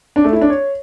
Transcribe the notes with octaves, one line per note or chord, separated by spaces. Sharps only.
D4
A3
E4
D4
C#5